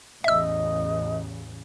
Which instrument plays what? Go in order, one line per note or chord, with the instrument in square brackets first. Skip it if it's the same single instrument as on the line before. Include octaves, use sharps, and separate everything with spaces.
[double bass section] A1 E2 C#3 [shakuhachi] D#5 [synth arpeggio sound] E5 E6